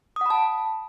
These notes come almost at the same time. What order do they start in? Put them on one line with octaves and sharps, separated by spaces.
D#6 F#5 B5 A5